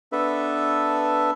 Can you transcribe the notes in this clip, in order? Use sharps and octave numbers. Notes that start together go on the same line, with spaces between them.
B3 D4 A4 B4 E5